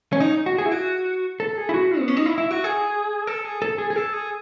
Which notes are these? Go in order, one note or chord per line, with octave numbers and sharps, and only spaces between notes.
C#4
D#4
F#4
G#4
E4
F#4
A4
G#4
E4
F#4
B3
C#4
D#4
E4
E4
F#4
G#4
A4
G#4
A4
G#4
G#4
A4
G#4